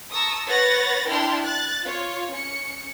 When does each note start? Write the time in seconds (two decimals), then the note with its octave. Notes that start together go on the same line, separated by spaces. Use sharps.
0.11 A5 A#5 C#6 D#6 E6
0.47 B4 C#5 F#5 B5 A6 A#6
1.08 D4 E4 G5 A5 C6 F6
1.43 F#6 A6
1.83 F4 C#5
2.32 C#4 C#7